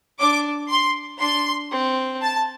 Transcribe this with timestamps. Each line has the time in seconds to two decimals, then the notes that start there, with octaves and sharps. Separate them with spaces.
0.19 D4 D6
0.71 C6
1.20 D4 C6
1.71 C4
2.22 A5